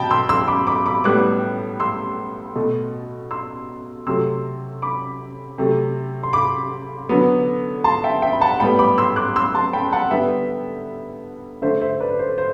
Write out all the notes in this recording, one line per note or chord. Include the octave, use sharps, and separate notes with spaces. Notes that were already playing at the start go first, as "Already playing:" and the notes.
Already playing: B2 G5 A5 B5
C6 E6
C6 E6
B5 D6
B5 D6
B5 D6
A2 G3 B3 D6 F#6
C6 E6
B2 A3
C6 E6
C3 F#3 A3 C6 E6
B5 D6
C3 F#3 A3
C6
B5 D6
D3 F#3 B3
A5 C6
E5 G5
E5 G5
B5
F#5 A5
A2 G3 B3 G5 B5
B5 D6
C6 E6
D6 F#6
C6 E6
A5 C6
G5 B5
F#5 A5
D3 G3 B3 E5 G5
D3 A3 C5 E5
C5 E5
B4 D5
C5
C5